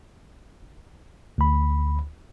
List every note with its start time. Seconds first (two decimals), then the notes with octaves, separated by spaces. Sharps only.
1.38 D2 B5